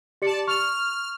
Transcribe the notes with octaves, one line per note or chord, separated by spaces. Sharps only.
G4 D5 A5 C#7
C#6 F6 F7